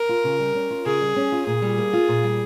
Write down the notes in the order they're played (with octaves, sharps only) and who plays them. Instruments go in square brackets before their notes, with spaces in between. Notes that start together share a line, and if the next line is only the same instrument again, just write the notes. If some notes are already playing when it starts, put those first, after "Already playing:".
Already playing: [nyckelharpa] A#4
[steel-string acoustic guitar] F4
C#3
G3
C#4
F4
[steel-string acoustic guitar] C#3 [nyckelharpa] G#4
[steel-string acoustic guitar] G3
C#4
F4
[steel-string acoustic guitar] A#2 [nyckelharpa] G#4
[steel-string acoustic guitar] G3
A#3
F4
A#2
G3